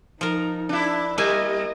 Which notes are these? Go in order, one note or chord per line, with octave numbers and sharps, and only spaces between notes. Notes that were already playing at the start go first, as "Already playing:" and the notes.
F3 D#4 A#4
D4 E4
G3 A#3 E4 D#5 G#5